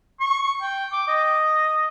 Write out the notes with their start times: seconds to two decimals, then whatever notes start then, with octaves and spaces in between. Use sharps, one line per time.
0.20 C#6
0.61 G5
0.92 D6
1.08 D#5